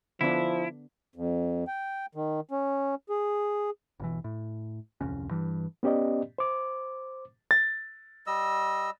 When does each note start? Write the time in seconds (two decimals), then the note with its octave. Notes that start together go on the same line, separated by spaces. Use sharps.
0.21 D3 F3 B3 D4 E4
1.16 F2
1.68 G5
2.15 D#3
2.51 C#4
3.10 G#4
4.00 G1 B2 E3
4.24 A2
5.01 D1 C2 F2 C#4
5.31 G2 E3
5.83 B3 C#4 G4 D5 D#5
6.38 C5 D6
7.51 A6
8.27 G3 D#5 E6